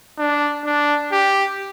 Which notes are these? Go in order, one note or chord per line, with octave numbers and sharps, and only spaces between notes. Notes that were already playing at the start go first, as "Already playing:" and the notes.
D4
D4
G4